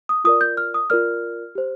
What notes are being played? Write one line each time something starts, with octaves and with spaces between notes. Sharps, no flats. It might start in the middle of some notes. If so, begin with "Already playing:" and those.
D#6
F4 A#4 D5 D#6
G6
F6
D#6
F4 A#4 D5 F6
G4 C5